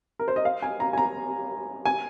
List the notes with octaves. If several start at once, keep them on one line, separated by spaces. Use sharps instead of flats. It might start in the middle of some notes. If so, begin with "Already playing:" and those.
A#4
C5
D#5
F5
G#5
A#5
G#5
A#5
G#5